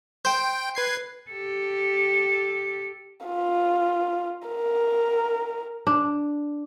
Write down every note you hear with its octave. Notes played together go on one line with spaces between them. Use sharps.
C5 G5 G6
B4 G#6 C7
G4 A4
F4
A#4
D4